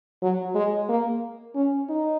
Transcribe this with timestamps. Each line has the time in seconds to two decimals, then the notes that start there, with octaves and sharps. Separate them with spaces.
0.22 F#3
0.55 G#3
0.89 A#3
1.55 C#4
1.89 D#4